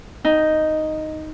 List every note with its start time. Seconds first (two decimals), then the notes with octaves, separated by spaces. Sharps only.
0.25 D#4